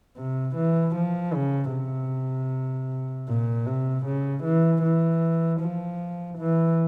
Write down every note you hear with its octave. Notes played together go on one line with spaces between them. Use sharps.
C3
E3
F3
C#3
C3
A#2
C3
C#3
E3
E3
F3
E3